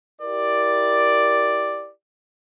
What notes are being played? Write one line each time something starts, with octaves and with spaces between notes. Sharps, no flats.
E4 G4 A#4 D5